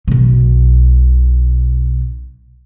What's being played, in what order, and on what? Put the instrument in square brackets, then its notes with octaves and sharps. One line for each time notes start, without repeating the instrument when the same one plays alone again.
[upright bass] B1 B2